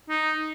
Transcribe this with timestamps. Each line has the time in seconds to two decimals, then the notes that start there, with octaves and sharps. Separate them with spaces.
0.09 D#4